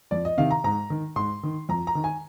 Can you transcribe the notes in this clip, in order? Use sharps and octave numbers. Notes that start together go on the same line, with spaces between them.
F2 D5
D#5
C3 D#3 F5
A#5
G#2 A#5
D#3
G#2 C6
D#3
F2 A#5
A#5
D#3
G#5